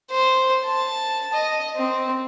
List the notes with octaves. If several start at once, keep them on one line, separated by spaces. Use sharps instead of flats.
C5
A5
D#5
C4